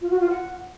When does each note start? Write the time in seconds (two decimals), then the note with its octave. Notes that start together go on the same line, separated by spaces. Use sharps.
0.01 F4
0.10 F#4
0.20 F4
0.30 F#5